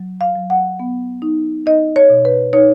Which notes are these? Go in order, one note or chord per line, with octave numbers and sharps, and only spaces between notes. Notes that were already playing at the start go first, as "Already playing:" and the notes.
Already playing: F#3
F5
F#3
F#5
B3
D#4
D#4 D#5
C#5
B2
B4
D#4 C#5